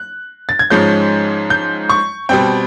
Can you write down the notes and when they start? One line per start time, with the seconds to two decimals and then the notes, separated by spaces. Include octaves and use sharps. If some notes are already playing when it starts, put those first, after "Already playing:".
Already playing: F#6
0.49 A6
0.59 G#6
0.70 G#2 F3 G#3 C#4 G6
1.50 G6
1.89 C#6
2.29 B2 G3 C4 G5